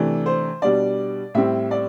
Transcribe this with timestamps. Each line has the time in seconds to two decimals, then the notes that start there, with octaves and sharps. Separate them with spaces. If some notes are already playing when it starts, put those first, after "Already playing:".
Already playing: C3 E3 A3 D4
0.26 C5
0.62 B2 G3 D4 D5
1.34 A2 G3 C4 E5
1.71 D5